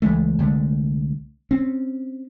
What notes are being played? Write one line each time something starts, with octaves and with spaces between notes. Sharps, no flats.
C#2 E3 G#3 A3
C2 D3 G#3 A3
C4 C#4